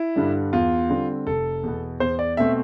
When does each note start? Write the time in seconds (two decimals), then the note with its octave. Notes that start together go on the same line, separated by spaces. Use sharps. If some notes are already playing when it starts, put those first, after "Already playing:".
Already playing: E4
0.16 G2 D3 G3
0.53 E2 F4
0.90 D3 G3 C4
1.27 F1 A4
1.63 E2 B2 B3
2.00 E2 C5
2.19 D5
2.37 B2 A3 C4 E5